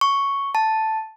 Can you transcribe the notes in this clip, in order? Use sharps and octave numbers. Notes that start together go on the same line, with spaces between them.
C#6
A5